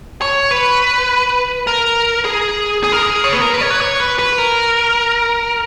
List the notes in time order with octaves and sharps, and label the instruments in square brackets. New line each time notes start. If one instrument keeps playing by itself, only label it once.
[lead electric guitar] C#5
B4
A#4
G#4
G#4
A#4
G#4
C#5
B4
A#4
B4
C#5
B4
C#5
B4
B4
A#4